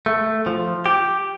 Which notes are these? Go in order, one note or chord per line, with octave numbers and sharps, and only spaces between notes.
A3
F3
G4